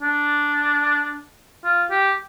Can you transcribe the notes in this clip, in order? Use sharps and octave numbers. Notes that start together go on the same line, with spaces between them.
D4
F4
G4